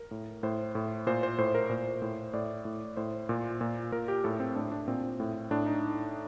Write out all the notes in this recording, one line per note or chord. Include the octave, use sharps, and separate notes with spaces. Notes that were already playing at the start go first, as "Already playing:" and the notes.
Already playing: A#4
A2
A2 C5
A2
A#2 C5
C5
A2 C5
A#4
A#2 C5
A2
A2 D5
A2
A2 C5
A#2
A#2
A#2 A#4
G4
A2 A4
C4
A2 D4
D4
A#2 C4
A2
A2 D4
D#4